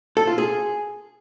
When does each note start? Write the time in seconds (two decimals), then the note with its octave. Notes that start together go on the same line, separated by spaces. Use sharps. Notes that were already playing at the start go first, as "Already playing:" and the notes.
0.17 A4
0.27 F4
0.38 G#4